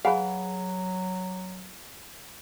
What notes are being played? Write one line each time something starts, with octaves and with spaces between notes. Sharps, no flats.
F#3 G#4 B4 F5 F#5 G#5 B5